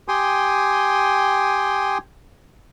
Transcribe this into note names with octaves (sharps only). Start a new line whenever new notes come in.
G4 G5 G#5 C6 D#6